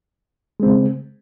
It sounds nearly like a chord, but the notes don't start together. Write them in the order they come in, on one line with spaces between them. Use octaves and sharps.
G#3 C4 C#3